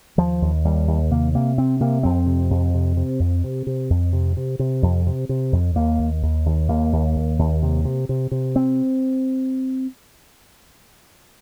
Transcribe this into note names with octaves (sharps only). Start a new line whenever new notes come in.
D#2 F3
D#2
D#2 G3
D#2
C3 A#3
C3 A#3
C3 C4
C3 A#3
F2 C4
C3
F2
C3
C3
F2
C3
C3
F2
C3
C3
C3
F2
C3
C3
F2
D#2 A#3
D#2
D#2
D#2
D#2 A#3
D#2
D#2
D#2
C3
C3
C3
C3
C4